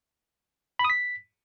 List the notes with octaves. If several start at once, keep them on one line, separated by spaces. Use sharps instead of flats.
B5
D#6
B6